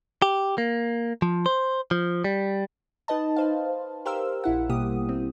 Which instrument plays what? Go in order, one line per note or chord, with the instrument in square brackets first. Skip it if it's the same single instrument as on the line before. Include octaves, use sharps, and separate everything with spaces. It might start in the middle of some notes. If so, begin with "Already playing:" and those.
[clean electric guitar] G4
A#3
F3
C5
F3
G3
[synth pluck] D#4 B4 D#5 A5
B4 C5 F5
G4 A#4 C5 F5 E6
A#1 E4 F#5
B2 G3 A#3 G4 D#6
C4